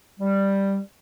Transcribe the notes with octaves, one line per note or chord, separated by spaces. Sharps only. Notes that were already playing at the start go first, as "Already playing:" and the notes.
G3